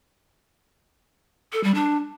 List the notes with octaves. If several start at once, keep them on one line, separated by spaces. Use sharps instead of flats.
A4
G3
D4